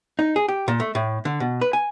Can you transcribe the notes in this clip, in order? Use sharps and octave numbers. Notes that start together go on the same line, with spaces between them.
D#4
G#4
G4
A#2
A3
A2
D3
B2
B4
G#5